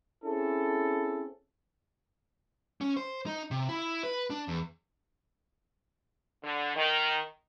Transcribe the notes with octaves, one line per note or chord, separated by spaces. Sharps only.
C4 C#4 E4 G#4 A4
C#4
C5
D#4
C3
E4
B4
D4
E2
D3
D#3